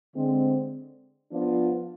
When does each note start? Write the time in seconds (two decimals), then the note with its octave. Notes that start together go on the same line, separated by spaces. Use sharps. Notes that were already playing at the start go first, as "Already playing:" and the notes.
0.15 D3 G#3 C4
1.30 F3 B3 D4 F4